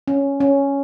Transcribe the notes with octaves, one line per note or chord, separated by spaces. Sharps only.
C#4
C#4